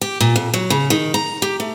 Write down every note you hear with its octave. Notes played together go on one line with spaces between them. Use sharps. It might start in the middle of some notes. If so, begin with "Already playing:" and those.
G4
A#2
F2
F#3
C#3
D#3
A#5
G4
A3